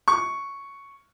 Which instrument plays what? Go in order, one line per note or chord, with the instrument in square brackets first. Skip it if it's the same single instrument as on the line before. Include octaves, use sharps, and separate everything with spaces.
[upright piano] C#6